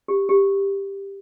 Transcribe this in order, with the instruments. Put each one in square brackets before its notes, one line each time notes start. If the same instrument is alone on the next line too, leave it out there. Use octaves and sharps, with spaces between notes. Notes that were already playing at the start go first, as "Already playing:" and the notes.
[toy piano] G4
G4